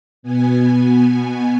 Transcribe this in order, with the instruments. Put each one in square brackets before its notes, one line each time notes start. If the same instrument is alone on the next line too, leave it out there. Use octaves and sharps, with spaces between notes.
[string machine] B2 B3 G#5